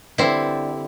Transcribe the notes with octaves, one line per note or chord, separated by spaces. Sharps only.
D3 G3 C4 E4